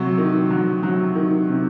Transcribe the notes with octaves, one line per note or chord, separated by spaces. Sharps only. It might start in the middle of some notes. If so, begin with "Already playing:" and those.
Already playing: C3 F#3
D#3
F#3
F#3
D#3
C3